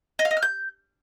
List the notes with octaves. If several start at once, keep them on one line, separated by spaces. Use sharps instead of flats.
D#5
F5
D#5
F6
G6